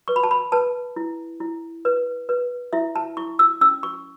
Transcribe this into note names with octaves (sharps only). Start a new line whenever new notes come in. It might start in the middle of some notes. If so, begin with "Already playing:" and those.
B4 C#6
B5
A5
B5
B4 A5
E4
E4
B4
B4
E4 E5
A5
E4 C#6
E6
C#4 E6
C#6